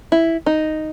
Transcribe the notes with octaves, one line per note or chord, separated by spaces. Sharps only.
E4
D#4